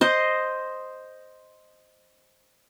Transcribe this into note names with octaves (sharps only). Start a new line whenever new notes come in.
C5 D#5